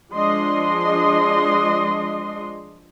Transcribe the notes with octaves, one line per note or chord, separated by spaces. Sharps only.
F3 G#3 D4 D#5 C6